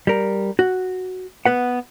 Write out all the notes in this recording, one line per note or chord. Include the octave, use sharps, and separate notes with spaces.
G3 A#4
F#4
B3 B4 F#5